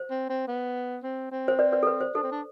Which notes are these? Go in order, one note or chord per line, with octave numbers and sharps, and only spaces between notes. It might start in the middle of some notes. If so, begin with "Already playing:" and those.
Already playing: C5
C4
C4
B3
C4
C4
C5
B4 D5
B4 D5
A4
B4
C5
D4 A4
C4
D4